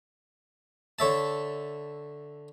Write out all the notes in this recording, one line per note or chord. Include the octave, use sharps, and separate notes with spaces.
D3 C#5 E5 A5